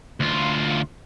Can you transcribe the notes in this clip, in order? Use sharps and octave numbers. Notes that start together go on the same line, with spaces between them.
D2 F4